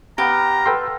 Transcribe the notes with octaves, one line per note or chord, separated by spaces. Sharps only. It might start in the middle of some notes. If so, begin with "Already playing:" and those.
B3 G4 F5 A#5
A4 B4 G5 C6